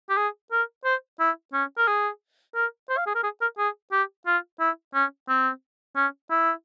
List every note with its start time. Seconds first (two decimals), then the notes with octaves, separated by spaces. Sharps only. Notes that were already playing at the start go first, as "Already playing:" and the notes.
0.10 G4
0.17 G#4
0.52 A#4
0.85 C5
1.20 E4
1.53 C#4
1.78 A#4
1.88 G#4
2.55 A#4
2.89 C5
2.98 F5
3.06 G#4
3.15 A#4
3.24 G#4
3.41 A#4
3.58 G#4
3.92 G4
4.27 F4
4.60 E4
4.94 C#4
5.29 C4
5.96 C#4
6.30 E4